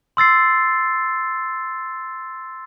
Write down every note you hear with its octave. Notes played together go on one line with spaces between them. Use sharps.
C6 E6 A6 C7